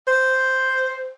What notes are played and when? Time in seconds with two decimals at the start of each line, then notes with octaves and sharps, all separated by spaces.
0.07 C5